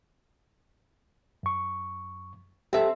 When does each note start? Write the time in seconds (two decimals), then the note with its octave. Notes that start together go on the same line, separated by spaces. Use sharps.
1.43 F#2 C#6
2.73 C4 G4 A4 E5